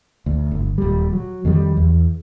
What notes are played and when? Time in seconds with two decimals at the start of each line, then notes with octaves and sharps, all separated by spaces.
0.26 D2
0.52 G1
0.78 D#1 G3
1.13 F#3
1.45 F2 D#3 F#3 G3
1.77 E2